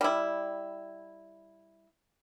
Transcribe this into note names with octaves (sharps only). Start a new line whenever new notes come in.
G3 E4